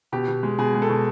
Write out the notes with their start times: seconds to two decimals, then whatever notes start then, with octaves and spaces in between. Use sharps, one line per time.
0.12 B2 G4
0.28 B2
0.43 G#3
0.59 B2 G#4
0.74 G#3
0.82 A4
0.89 B2